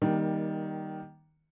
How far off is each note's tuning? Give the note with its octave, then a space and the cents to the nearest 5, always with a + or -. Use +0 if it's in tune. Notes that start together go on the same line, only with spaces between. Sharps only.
D#3 +0 G3 +0 A#3 +25